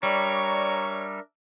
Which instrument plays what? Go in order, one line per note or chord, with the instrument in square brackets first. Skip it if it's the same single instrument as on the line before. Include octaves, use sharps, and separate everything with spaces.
[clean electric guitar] G3 [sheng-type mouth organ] D4 A#4 E5 [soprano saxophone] C#5 [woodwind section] D5 A#5 C#6